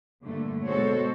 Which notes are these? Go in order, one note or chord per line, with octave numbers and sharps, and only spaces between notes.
G2 A#2 D3 A3
B2 G#3 F#4 A4 C5 C#5